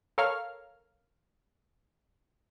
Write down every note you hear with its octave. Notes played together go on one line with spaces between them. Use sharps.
A4 A#4 C#5 F5 F6